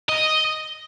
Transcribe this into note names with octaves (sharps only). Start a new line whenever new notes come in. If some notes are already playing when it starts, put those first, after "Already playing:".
D#5